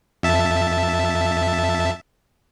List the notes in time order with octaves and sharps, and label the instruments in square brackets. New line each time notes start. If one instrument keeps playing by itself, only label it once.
[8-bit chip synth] F2 E5 A5